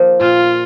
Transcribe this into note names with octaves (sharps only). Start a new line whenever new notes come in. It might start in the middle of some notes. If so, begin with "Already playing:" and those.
Already playing: F3 A#3 D#4
A#2 F4